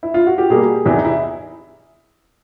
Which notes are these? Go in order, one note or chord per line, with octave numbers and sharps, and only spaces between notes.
E4
F4
F#4
G4
B2 G3 A#3 G#4
E2 C3 E3
D#4
E4